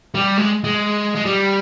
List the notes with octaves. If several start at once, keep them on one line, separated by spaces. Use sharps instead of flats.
G3
G#3
G#3
G#3
G3